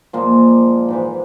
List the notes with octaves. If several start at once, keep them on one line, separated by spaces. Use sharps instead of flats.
A#2 F3 G#3 A#3
G#2 E3 G#3